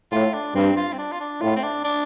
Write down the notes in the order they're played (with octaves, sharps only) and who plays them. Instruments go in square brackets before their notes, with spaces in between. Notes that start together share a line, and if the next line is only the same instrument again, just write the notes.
[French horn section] A2 [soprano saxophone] F4
[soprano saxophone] D4
[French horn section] G2 [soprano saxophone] C4
[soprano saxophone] F4
C4
D4
F4
D4
[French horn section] A2 [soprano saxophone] F4
[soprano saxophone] C4
D4
D4